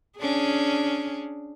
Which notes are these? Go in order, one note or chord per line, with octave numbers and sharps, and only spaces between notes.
C#4 D4 G#4